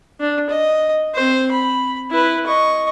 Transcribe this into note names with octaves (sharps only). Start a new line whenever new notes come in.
D4
D#5
C4 C5
B5
E4 B4
D#5 C#6